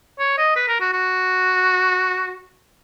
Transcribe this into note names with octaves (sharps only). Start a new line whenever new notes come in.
C#5
D#5
B4
A#4
F#4
F#4